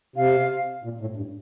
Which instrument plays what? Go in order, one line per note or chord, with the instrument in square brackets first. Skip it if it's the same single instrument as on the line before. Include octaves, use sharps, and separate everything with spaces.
[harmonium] C3 [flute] F5
[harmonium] A#2
A2
G2